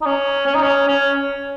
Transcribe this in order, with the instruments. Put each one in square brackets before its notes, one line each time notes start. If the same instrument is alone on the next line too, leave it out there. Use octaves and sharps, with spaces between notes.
[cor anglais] D#4
C#4
C#4
D#4
C#4
C#4